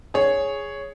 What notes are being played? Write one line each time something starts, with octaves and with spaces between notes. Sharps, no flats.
G#4 C#5